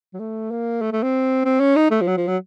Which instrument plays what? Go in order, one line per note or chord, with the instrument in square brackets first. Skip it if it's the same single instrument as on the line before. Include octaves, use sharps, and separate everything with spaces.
[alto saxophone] F#3
A3
A#3
A3
A3
C4
C4
C#4
D#4
A3
F3
F#3
F3
F#3